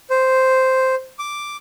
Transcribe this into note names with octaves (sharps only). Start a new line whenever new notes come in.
C5
D6